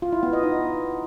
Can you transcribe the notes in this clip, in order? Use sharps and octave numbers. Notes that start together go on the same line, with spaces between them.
F4
E4
B3
D#5
D#4